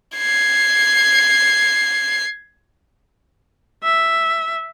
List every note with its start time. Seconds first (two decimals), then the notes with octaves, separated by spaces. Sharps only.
0.17 G#6 C7
3.84 E5